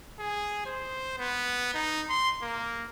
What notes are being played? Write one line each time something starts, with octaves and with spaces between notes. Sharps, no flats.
G#4
C5
B3
D#4
C6
A#3